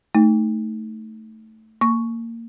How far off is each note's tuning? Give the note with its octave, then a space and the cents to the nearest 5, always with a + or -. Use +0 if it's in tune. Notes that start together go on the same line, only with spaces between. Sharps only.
A3 +0 D#4 +5
A#3 -20 C#6 +0